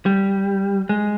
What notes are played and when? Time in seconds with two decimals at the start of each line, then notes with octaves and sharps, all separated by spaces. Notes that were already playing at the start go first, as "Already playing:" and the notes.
0.06 G3
0.89 G#3